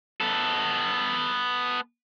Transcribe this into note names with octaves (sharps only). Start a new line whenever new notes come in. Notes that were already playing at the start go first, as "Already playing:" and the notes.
B3 A4